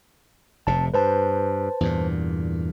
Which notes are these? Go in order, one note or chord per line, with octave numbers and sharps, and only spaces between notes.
F1 C3 A5
G2 B4 C5 A5
E2 G2 A#2